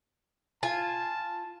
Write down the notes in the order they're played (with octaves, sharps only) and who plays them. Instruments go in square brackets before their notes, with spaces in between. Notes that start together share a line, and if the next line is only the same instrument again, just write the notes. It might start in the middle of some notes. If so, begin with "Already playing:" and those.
[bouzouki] F4 G#5 [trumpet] A5